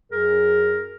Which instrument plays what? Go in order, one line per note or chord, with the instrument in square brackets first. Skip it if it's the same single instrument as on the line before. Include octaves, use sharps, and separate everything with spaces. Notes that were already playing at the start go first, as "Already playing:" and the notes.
[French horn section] F#2 G#4 [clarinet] A#4